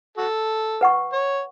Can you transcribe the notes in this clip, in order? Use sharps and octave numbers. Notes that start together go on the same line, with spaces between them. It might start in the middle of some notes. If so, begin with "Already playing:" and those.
F#4 A4
B4 F#5 C#6
C#5